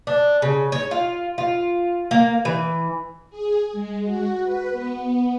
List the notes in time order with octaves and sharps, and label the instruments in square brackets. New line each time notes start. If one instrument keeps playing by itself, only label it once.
[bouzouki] D4
C#3
C#5
F4
F4
A#3
E3
[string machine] G#4
G#3
F#4
B4
B3